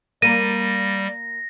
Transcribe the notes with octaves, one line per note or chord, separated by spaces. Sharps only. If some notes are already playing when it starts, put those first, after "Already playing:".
G3 A#3 A#6 D#7